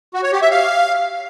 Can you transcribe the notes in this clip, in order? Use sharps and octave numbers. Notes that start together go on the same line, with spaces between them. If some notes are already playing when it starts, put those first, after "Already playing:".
F#4
C#5
G4
E5
F5